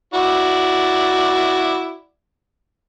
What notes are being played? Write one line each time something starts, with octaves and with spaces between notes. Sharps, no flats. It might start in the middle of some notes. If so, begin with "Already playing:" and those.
E4 F#4 D5